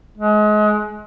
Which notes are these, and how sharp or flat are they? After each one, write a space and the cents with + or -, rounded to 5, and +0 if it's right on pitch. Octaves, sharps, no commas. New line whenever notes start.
G#3 +30